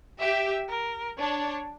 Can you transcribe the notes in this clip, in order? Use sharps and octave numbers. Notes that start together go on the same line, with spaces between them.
G4 E5
A#4
D4 C#5